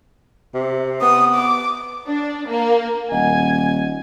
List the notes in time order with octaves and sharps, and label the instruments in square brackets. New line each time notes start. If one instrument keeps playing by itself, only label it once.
[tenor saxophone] C3
[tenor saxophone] B3 [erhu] D#6
[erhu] D6
[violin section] D4
A#3
[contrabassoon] D#1 [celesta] D#5 F#5 [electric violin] G#5